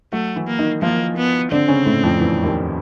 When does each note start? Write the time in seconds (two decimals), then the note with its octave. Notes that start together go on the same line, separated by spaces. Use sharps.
0.13 F#3 A3 F#4
0.36 E3 E4
0.47 A#3
0.59 D#3 D#4
0.82 F3 A#3 F4
1.17 B3
1.52 D3 C4 D4
1.68 C#3 C#4
1.86 A2 A3
2.03 F2 F3
2.21 E2 E3
2.44 D#2 D#3